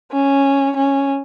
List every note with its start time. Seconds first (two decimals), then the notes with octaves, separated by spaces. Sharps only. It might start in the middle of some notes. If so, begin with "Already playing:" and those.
0.12 C#4
0.76 C#4